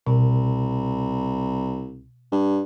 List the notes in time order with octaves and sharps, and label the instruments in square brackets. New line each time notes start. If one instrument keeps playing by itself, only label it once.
[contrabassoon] C2 [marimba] B2
[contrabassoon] G2